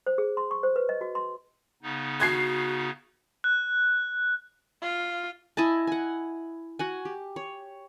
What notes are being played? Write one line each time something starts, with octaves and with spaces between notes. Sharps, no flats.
C5
G#4
C6
C#6
C5
B4
D#5
F#4
C6
C#3 B3 D#4
F#4 F#6 G#6 C7
F#6
F4
E4 D#5 G#5 A5
F#5 G#5
F#4 F#5 G#5
G4
C#5